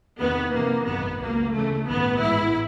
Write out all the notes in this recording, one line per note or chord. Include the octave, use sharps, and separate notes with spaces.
E2 C3 D#3 B3
F2 C3 E3 A#3
G#1 F#2 D#3 B3
C#2 B2 A#3
D2 C#3 E3 A3
A1 G2 D#3 B3
A1 G#2 E3 E4